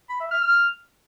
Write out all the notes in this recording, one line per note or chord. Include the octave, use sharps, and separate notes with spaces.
B5
E5
F6
F6